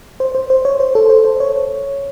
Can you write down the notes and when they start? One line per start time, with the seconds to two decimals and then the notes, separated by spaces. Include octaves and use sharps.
0.20 C5
0.35 C5
0.50 C5
0.65 C#5
0.80 C5
0.95 A4
1.10 C5
1.25 C5
1.40 C#5